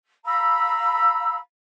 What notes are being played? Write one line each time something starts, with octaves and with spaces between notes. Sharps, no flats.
F5 A#5 B5 E6